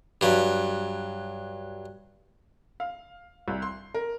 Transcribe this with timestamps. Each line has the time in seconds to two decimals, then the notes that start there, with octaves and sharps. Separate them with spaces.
0.21 G2 F#3
2.80 F5
3.48 C2
3.62 C6
3.94 A#4